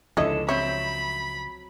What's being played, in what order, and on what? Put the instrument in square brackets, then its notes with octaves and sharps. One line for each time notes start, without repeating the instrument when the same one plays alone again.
[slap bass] C#2 F3 [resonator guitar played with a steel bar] D3 C#4 A4 [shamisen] E4 C#5 D#5
[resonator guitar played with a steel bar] F#3 C4 E5 [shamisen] C#5 [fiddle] B5